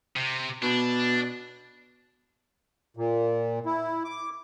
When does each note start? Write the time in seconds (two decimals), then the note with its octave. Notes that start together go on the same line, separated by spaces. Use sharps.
0.16 C3
0.63 B2 D4
2.97 A#2
3.66 E4
4.05 D6